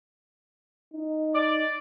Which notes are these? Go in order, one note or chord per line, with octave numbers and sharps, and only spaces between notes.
D#4
D5